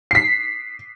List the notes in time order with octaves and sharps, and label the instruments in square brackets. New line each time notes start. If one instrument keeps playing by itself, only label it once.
[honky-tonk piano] B6 C7